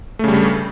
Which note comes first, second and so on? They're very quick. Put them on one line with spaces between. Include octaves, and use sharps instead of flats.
A3 C#3 G3 G2